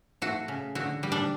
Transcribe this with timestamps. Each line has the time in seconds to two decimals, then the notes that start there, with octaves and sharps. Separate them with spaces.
0.22 A3 F#4
0.48 C#3
0.75 D3 F#4
1.03 G3
1.12 D4